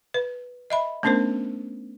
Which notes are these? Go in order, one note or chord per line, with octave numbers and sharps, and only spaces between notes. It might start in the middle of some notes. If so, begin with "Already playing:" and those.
B4
D#5 E5 B5
A3 B3 C#4 D4 A#4 C5